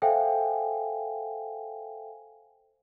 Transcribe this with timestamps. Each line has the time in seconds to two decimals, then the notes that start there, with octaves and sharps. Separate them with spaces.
0.02 A4 C5 E5 F5 G5 G#5